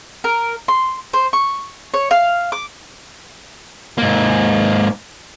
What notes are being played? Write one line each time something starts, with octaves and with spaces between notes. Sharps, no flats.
A#4
C6
C5
C#6
C#5
F5
D6
G#2 A#3